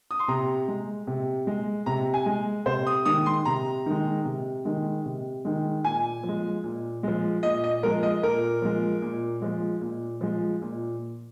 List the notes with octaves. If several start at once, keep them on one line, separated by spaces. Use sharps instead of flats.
D#6
C6
C3 A#5
G#3
C3
G#3
C3 A#5
G#5
G#3
C3 C5
D#6
D#3 G#3 D#6
C6
C3 A#5
D#3 G#3
C3
D#3 G#3
C3
D#3 G#3
A#2 G#5
F3
G#3
A#2
F3 G#3
A#2 D#5
D#5
F3 G#3 A#4
D#5
A#2 A#4
F3 G#3
A#2
F3 G#3
A#2
F3 G#3
A#2